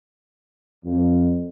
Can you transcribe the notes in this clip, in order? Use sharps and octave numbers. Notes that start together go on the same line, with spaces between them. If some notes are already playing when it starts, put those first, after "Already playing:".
F2